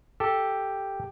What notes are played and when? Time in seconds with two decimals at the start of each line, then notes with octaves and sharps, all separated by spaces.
0.20 G4 A4